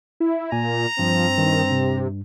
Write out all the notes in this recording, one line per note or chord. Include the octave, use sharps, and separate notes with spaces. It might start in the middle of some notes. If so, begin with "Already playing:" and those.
E4
A#2 G#5 A#5
G2 F3 C4
G2 D#3
C3